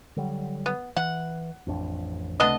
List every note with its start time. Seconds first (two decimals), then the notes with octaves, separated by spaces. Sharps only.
0.16 D3 F#3 G3
0.66 B3
0.97 E3 F#5
1.67 A1 F2 D4
2.40 C#2 C3 A3 B3 D4 D#5